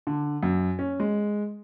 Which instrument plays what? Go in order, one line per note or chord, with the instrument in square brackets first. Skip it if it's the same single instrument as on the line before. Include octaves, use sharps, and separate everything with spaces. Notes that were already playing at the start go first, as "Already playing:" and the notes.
[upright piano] D3
F#2
C#4
G#3